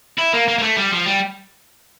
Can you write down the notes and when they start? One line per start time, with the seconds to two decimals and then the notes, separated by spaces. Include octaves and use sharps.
0.19 E4
0.34 A#3
0.48 A#3
0.58 A#3
0.62 A3
0.77 G3
0.91 F3
1.06 G3